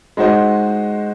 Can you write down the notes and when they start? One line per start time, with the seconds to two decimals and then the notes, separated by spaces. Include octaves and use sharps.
0.17 G#3 D#4 F#4 C5 D#5